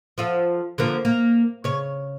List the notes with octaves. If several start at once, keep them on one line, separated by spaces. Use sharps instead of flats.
F3 F4 A4
D3 F3 A#3
A#3
C#3 C#5